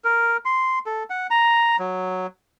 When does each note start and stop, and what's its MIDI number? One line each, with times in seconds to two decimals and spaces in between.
0.04 0.37 70
0.45 0.79 84
0.86 1.03 69
1.10 1.27 78
1.30 1.76 82
1.79 2.27 54